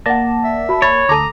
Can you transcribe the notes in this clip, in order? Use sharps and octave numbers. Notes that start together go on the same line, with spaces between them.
A#3 D5 F#5 A5 A#6
E5
F#4 B5
C#5 B5 A6
D2 A4 A#5 D6 D#6